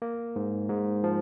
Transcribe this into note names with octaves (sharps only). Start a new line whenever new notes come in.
A#3
G#2
G#2
F3